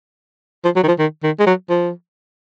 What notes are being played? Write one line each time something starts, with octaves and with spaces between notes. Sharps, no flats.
F3
F#3
D#3
F3
D#3
D#3
G#3
F#3
F3